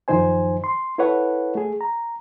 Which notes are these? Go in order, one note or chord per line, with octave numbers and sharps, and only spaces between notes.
F#2 D#3 F3 D#4 C5 G#5
C6
E4 A4 B4 C#5 F#5
A3 G#4
A#5